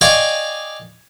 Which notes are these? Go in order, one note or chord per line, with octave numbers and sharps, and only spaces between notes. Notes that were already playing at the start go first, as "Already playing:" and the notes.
D5 D#5 F5 G5 G#5 C#6